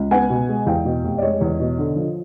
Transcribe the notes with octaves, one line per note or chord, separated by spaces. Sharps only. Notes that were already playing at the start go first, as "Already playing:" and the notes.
Already playing: C#2
B3 F#5 G#5
B2
G#3
E2 F5 G5
B2
F1
D5
G#3 C#5 D#5
E2
B2
D3
F3